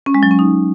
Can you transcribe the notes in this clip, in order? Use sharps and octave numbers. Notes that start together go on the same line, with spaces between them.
C#4
G#3
F#3
C#4
D#4